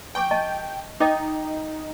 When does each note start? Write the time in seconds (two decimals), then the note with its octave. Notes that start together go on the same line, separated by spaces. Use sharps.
0.15 G5 G#5 C#6 D6
0.31 D#5 A5 C#6
1.00 D#4 D#5 G5 D6